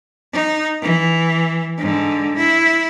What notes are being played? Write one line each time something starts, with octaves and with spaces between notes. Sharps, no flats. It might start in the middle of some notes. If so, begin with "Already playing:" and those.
D#4
E3
G#2 D3
E4